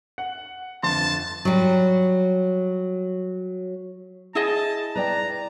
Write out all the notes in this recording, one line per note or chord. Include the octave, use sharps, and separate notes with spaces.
F#5
G1 F2 A5 C6
F#3 G3
E4 G#4 D#5 A5
B4 D5 G5 A#5